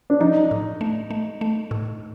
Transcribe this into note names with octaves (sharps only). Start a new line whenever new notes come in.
D4
F3 D#4
A2
A3
A3
A3
A2